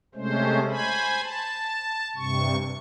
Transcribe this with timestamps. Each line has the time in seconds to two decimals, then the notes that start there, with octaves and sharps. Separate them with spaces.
0.15 C3 G#3 A3 C#4 C5
0.69 C5 G#5 B5
1.23 A5
2.16 G2 C3 C#6